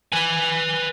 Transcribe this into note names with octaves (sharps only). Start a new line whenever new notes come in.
B4 G#5